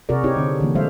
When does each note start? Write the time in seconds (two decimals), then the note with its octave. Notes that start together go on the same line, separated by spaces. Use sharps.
0.09 C3 F#4 G#4 A#4 D5
0.24 C4 D#4 E4 G4 C#5
0.36 D3 C4 D4
0.61 D3 E3 A#3
0.75 G3 G#3 C5 E5 F5